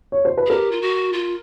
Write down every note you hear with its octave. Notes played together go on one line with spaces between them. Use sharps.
C#5
C5
B4
G#4
G4 A#4
F4
F#4
F4